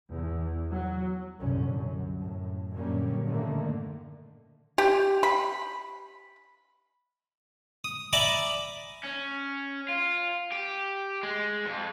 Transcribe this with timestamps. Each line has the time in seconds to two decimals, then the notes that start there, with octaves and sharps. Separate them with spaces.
0.11 E2
0.71 F#3
1.38 C2 F#2 A#2 D3 C#4
1.70 F#2
2.17 F#2 A2
2.74 F#2 A#2 D3 G3 A#3 C#4
3.27 A2 D3 D#3 A3 A#3
4.78 G4
5.23 B5
7.84 D#6
8.13 D5 E5 G#5 A#5 B5 D6
9.03 C#4
9.89 F4
10.52 G4
11.23 G#3
11.66 F2